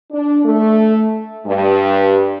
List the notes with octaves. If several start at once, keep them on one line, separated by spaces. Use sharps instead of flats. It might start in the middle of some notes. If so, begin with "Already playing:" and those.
D4
A3
G2